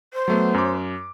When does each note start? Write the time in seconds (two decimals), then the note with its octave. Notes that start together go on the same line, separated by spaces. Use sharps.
0.13 C5
0.28 F#3 A3 B3
0.54 F#2 D6